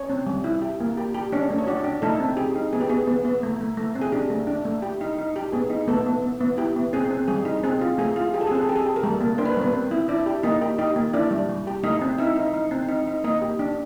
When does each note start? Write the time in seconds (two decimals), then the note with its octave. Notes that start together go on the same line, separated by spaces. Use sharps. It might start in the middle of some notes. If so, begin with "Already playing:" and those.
Already playing: C#4 C#5
0.10 C4
0.27 G3
0.44 E4
0.62 G4
0.80 A#3
0.97 G4
1.15 G4
1.32 C#4 D4 C#5
1.50 A3
1.58 C#5
1.67 D4 F#4 D5
1.84 D4
2.02 A3 D#4 A4
2.20 C4
2.37 G4 G#4
2.56 D#4
2.73 B3 G#4
2.81 G4
2.89 B3 G#4
3.08 B3
3.25 B3
3.43 A3
3.61 A3
3.77 A3
3.95 C4
4.02 G#4
4.12 D4 G4
4.30 A3
4.47 D4
4.65 A3
4.82 G4
5.01 D#4
5.18 D#4
5.36 G4
5.52 B3 G#4
5.70 D#4
5.88 A3 B3 A4
6.06 B3
6.23 B3
6.41 B3
6.58 E4 G4
6.76 B3
6.93 C4 G#4
7.11 C4
7.28 G3 G#4
7.45 D#4
7.63 C4 G#4
7.81 F4
7.98 A3 G#4
8.16 F4
8.34 G4 G#4
8.41 A4
8.47 G#4
8.51 C4 A4
8.62 G#4
8.69 G4 A4
8.76 G#4
8.85 G4
8.96 A#4
9.03 G3 A3 A4
9.21 A#3
9.38 D4 C5
9.45 B4
9.54 A#4
9.57 G3 B3 B4
9.73 C4
9.91 E4
10.08 D4 E4 D5
10.26 G4
10.43 A#3 D#4 D#5
10.62 G4
10.79 D#4 G4 D#5
10.96 A#3
11.13 D4 E4 D5
11.31 G3
11.49 G3
11.67 G4
11.83 A3 D#4 D#5
12.01 C4
12.18 D#4 E4 E5
12.36 D#4
12.54 D#4
12.71 C4
12.89 D#4
13.07 D#4
13.24 A#3 D#4 D#5
13.42 G4
13.59 D4